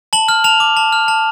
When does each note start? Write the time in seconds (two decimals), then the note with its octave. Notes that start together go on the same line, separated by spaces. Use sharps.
0.13 A5 F#7
0.28 F6
0.44 A5 F7
0.60 D6
0.76 A5
0.92 F6
1.08 A5